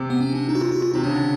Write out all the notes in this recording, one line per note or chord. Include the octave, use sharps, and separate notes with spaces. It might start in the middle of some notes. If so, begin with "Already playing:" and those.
Already playing: C3
B3
C#4
D4
D#4
F#4
F4
F#4
F4
C3 D#4
C#3 D4
D3